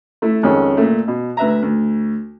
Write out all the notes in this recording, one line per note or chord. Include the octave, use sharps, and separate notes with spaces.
A3 E4
F2 D#3 G#3 C#4
A#2 A3
B2
D2 B4 E5 A#5
D2